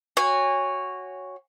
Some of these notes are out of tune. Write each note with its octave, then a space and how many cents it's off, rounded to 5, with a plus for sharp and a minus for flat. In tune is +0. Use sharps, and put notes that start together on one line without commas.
F#4 +0 C#5 +0 G#5 -25